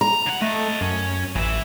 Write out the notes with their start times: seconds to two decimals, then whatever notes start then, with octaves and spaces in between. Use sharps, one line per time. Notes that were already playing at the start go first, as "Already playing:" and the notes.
0.01 A#5
0.26 D3 F#5
0.42 A3 A4 D#5
0.81 F#2 C#4
1.36 A1 E3 E5